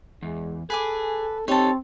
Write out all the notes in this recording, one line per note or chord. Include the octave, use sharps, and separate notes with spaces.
E2 G#3
G#4 A4 B4 G#5 D6
C4 D#4 G4 A4 C#5 A5